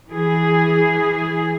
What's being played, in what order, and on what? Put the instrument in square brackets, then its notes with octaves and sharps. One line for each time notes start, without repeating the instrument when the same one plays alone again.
[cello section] E3 G#4